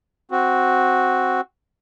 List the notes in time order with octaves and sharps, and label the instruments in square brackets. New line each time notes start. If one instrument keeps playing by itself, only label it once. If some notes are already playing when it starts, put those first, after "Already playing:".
[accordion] C4 F#4